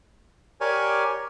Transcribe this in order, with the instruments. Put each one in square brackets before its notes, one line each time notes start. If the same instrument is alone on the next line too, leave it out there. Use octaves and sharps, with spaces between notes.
[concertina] G4 A#4 C#5 D5 G#5